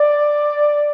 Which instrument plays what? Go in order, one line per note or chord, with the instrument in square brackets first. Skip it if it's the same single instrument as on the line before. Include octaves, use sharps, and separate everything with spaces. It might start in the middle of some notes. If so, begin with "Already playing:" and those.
Already playing: [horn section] D5